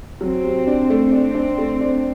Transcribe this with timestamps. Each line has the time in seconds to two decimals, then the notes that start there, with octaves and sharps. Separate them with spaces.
0.21 F#3 C4
0.44 C3
0.67 D4
0.90 A3
1.12 C4 D4
1.35 D4
1.58 A3
1.81 D4